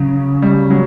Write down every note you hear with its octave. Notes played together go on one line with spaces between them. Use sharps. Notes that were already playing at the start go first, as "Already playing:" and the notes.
Already playing: C#3 F#3
G3
F#3